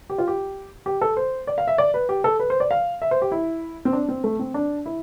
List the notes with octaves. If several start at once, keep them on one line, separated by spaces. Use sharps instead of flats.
G4
F4
G4
G4
A4
C5
D5
F5
E5
D5
B4
G4
A4
B4
C5
D5
F5
E5
C5
G4
E4
C4
D4
C4
A3
C4
D4
E4